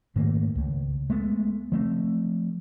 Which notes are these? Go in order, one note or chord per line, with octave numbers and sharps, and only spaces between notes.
G#2 D#3 A3 A#3
C#2
G#3 A3 B3
F3 A3 C4